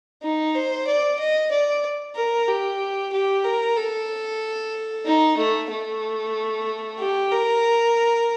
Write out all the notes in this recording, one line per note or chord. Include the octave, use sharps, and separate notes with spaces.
D#4
C5
D5
D#5
D5
A#4
G4
G4
A#4
A4
D#4
A3
A3
G4
A#4